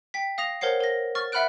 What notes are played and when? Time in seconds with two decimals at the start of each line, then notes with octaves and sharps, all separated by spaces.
0.14 G5 B6
0.38 F5 D#6 A#6 F7
0.61 A#4 C5 C#5 F#5 C7
0.80 A#4 A#6
1.15 C#6 F6 A6
1.32 E5 F#5 B5 F6 F#6 D7